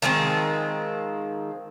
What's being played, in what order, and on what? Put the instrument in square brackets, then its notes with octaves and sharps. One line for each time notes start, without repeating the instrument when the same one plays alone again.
[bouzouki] D#3 F3 G#3 C4